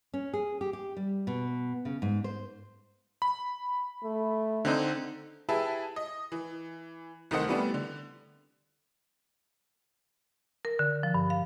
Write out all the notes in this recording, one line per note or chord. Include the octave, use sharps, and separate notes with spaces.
C#4
G#4
G4
G4
G3
B2
C#3
G#2
C5
B5
A3
D3 C4 D#4
E4 G4 G#4 B4 E5 A5
D#5
E3
C2 D#3 A3 C5 D#5 F#5
E3 G3 A3 B3 C4 D4
D3
A#4
D3
F3
G2
F5